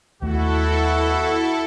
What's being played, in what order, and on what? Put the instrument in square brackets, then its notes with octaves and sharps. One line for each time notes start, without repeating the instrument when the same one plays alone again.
[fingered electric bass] D#2 A3 [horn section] B2 F#4 [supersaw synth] E4 A4